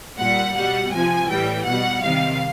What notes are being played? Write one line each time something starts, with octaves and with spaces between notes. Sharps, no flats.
A#2 G3 F#5
B2 G3 F#5
C3 F3 G#5
A2 E3 G3 G5
B2 G3 F#5
C3 D#3 G3 F5